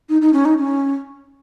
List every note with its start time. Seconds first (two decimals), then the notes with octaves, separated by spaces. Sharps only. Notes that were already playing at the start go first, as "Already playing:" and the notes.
0.09 D#4
0.21 D#4
0.33 C#4
0.45 D#4
0.58 C#4